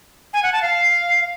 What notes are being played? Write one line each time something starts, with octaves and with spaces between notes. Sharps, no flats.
G#5
F#5
A5
F5